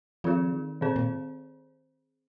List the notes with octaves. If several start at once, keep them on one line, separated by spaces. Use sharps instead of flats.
D#3 F3 C4 F4 G#4
D#3
A#2 D#3 C4 G#4 C5
A#2